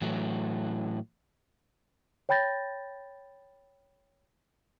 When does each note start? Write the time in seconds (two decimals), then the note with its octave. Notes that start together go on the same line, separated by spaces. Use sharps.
0.02 A2 E3 F#3 A3
2.29 C#5 G5 B5 G6 A6 A#6